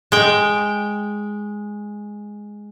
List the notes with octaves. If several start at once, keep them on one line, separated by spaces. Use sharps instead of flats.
G#3 G5